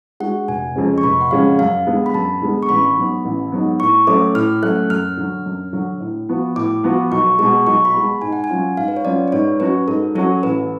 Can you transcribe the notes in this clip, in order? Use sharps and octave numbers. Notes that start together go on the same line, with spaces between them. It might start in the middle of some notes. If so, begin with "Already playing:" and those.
G#3 D4 F#4 F#5
F1 G#5
F2 C#3 G#3 C#4
C#6
F1 B5
F#5
F2 C#3 G#3 C#4 F5
F#2 F5
D3 G#3 B3
B5
F#2 A5
D3 G#3 B3
C#6
A1 B5
G#2 F#3 B3
A1
G#2 F#3 B3
A2 C#6
F#3 A3 C#4 D6
A2 F6
F#3 A3 C#4 F#6
F#2 F6
D3 F#3
F#2
D3 F#3
A2
F3 B3 F#4
A2 D6
F3 B3 F#4
B1 C#6
B2 G#3 C#6
B1 C#6
B5
B2 G#3
A5
G#2 G#5
F#5
G#5
F#3 C#4 F4
G#2 F5
B4
C#5
F#3 C#4 F4 D5
B4
G#2 C#5
F#3 C#4 F#4 B4
G#2 A4
F#3 C#4 F#4 A4
A1 B4